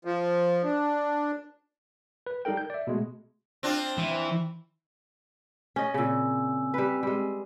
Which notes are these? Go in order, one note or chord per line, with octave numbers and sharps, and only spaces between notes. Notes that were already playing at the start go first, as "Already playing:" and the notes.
F3
D4
B4
G3 D#4 A4 A#4 G5
G6
D5 E5
B2 G#3 A3
C4 D4 F4
E3
C#4 D#5
A#2 C#3 C4 G#5 E6
G3 B4
G3 G#3